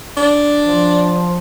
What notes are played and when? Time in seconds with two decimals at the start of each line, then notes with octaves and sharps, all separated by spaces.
0.17 D4
0.63 F3